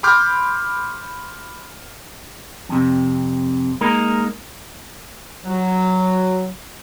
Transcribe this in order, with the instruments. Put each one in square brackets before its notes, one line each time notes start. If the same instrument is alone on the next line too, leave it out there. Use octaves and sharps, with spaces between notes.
[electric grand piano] B5 C6 D6 F6 G6
[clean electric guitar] F2 C3
G#3 A#3 D#4 A#4
[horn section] F#3